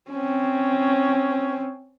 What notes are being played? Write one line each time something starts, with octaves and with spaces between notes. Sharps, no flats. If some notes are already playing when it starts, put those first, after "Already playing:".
C4 C#4